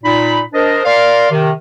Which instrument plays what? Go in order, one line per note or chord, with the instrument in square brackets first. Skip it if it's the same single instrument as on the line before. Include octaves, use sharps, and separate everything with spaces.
[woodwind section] A#2 D#4 B5
D4 A#4 C5 D#5
A#4 D5 F5 C6
C3 D#3